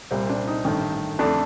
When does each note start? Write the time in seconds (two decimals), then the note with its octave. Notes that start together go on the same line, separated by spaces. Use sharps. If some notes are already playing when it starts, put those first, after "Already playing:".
0.11 C2 A#2 G3 C4
0.30 D4
0.48 D#4
0.65 A1 G2 D#3 A3
1.19 F2 D3 A3 D4